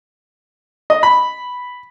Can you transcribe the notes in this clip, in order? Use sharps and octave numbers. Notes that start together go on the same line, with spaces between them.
D#5
B5